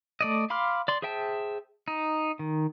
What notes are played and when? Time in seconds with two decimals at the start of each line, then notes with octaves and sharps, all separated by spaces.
0.21 A3 D5 D#5
0.50 F5 B5 C6 D6 F6
0.88 D5 C6
1.02 G#4 C5 E5 G5 A5
1.88 D#4
2.39 D#3